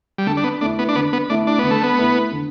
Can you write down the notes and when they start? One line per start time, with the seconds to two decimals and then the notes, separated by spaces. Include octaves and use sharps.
0.18 G3
0.26 D3 A3
0.37 D4
0.44 B3
0.61 A3 D4 E4
0.79 B3
0.89 D4
0.95 D3 B3
1.13 B3
1.30 A3 D4 E4
1.47 D4
1.59 D3 B3
1.71 A3
1.83 B3
1.98 A3 E4
2.32 D3